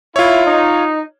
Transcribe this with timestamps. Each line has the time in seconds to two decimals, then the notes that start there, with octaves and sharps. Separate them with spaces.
0.16 E4 F4 C#5
0.46 D#4